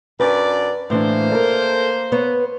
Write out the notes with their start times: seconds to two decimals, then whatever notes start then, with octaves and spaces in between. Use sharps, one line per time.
0.20 F#2 D4 B4 D5
0.90 A2 E3 A#3 D4 C5
1.32 A4 A#4
2.12 B3 B4 C#5